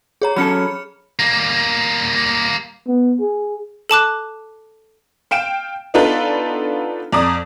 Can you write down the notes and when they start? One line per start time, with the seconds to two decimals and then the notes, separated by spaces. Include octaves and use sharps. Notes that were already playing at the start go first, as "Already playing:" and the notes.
0.22 G#4 C#5 A#5
0.36 F#3 C#4 A4 B5 F6 C#7
1.19 G3 A#3
2.88 B3
3.20 G#4
3.90 A4 A5 D6 F#6
5.31 F5 G5 D7 E7
5.94 B3 D4 D#4 F4 A4 B4
7.12 F2 D5 A#5 D#6